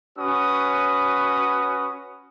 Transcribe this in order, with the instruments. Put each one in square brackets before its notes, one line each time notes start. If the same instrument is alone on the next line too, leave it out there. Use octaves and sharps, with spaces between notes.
[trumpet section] C#4 F#4 B4 D#6